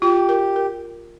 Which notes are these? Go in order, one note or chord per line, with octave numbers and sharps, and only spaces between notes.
F4 G4
A#4
A#4